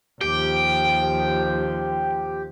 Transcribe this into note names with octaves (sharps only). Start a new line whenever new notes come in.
D#2 F3 G4 G5